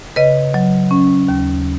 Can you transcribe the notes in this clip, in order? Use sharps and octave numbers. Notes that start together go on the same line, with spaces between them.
C#3 B4 D#5
F#3
C#4
D#2